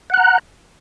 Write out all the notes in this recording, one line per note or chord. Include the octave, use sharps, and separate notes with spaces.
F#5 A#5 F#6